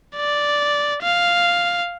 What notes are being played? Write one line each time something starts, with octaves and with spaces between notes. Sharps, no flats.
D5
F5